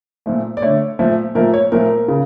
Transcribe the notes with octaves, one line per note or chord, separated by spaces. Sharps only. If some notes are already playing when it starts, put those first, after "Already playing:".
A#2 F3 A3
D5
D3 A3 C#5
A#2 F3 A3
A#2 F3 A3 A#4
C#5
A#2 F3 A3 A#4
C#3